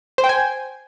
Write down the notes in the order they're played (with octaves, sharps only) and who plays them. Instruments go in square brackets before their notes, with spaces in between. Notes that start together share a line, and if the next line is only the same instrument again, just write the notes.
[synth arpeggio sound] C5
G5
G#5